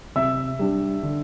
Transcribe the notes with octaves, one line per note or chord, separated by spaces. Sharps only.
C3 E5 E6
G3 D4
D3